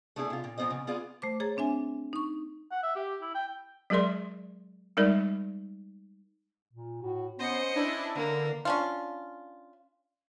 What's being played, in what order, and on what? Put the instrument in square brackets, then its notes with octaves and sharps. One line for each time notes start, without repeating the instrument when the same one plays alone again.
[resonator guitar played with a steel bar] A3 B3 D4 E4 G#4
C3 F4
A#2
A#2 F3 B3 C5 D#5
C#3
B3 F4 G#4 D5 F5
[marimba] A3 C5 D6
G#4 C#5 A#5 A6
C4 D4 E5 G#5
D#4 C#6
[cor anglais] F#5
E5
G4
E4
G5
[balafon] F#3 G#3 G#4 A#4 D5 C6
G3 G#3 D#4 A#4 D5
[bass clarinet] A#2
[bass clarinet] A2 [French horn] F#4
[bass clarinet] B3 [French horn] C#4 [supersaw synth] C5 C#7 [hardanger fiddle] D#5
[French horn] C#4 [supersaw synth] D4 E4 [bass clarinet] B4
[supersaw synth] D3 [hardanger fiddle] A#3
[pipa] C#4 D4 F4